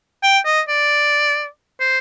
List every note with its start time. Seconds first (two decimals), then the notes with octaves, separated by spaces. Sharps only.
0.23 G5
0.45 D#5
0.68 D5
1.80 C5